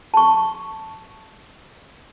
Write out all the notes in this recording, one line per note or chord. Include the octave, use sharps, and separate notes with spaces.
A5 C#6